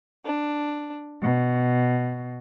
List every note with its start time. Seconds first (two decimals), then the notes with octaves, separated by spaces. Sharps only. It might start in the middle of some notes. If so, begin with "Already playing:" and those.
0.25 D4
1.22 B2